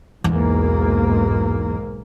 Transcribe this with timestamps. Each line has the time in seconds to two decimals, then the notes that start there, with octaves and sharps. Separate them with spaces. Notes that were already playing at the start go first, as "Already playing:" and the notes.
0.24 B1 E2 G#2 A#3